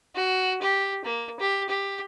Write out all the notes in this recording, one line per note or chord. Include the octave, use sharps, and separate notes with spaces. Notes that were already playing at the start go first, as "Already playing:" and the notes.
F#4
G4
A#3
G4
G4